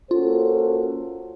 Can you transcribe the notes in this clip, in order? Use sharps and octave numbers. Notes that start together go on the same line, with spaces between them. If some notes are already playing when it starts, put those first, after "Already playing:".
A#3 C#4 F4 F#4 A4 C5